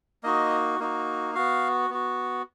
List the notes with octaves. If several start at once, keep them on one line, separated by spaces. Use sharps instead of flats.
A#3 D#4 F#4 D#5
A#3 D#4 F#4
B3 F#4 F5
B3 F#4